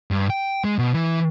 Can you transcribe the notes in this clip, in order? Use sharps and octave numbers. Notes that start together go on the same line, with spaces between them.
G2
G5
G#3
B2
E3